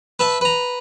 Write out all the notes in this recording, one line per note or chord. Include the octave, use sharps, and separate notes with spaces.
B4 E5 A5
B4 A#5